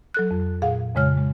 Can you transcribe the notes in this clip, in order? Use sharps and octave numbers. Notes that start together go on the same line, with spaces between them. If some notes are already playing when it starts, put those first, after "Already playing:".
F#3 A4 F#6
F2
A#2 G#4 F5 F#5
F2 C#3 G#3 C#5 F6
G#3